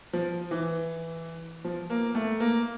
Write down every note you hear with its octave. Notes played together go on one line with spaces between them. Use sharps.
F3
E3
F3
A#3
A3
A#3